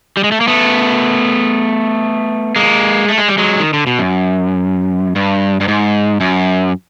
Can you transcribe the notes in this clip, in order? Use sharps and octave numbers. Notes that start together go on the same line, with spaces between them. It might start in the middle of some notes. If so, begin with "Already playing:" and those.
G3
G#3
A3
A#3
A3 B3
G#3 A#3
A3
G#3
G3
F#3 G#3
D#3
D3
B2
F#2
G2
G2
G#2
F#2